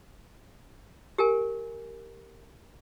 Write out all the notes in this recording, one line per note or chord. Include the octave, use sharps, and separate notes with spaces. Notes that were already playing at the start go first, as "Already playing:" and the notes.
G4 A#4 G#5